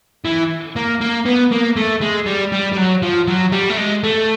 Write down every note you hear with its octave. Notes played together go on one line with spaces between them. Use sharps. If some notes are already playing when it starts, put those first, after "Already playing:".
E3
A#3
A#3
B3
A#3
A3
G#3
G3
G3
G3
F#3
F3
F#3
G3
A3
G#3
A3